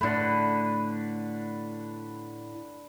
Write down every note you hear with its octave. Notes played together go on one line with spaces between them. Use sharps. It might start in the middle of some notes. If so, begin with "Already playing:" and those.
A2 D3 A3 B4